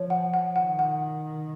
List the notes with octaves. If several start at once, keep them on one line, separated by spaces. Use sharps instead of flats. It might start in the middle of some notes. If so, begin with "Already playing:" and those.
Already playing: F3 C#5
F#5
F#5
D#3 F#5
F#5